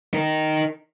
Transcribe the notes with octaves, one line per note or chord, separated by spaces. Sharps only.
D#4 A#4